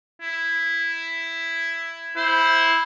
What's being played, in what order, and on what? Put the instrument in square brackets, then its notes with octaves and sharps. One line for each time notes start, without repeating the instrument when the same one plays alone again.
[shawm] E4
[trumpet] E4 [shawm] C5